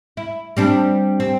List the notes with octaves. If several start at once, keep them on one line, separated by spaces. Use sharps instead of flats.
E4
G3 C4 D4
C4